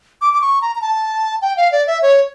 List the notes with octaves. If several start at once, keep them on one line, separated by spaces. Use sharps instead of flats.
D6
D6
C#6
A#5
A#5
A5
G5
F5
D5
E5
C#5